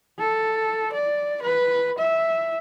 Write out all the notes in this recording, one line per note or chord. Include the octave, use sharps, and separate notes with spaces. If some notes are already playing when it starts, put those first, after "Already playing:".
A4
D5
B4
E5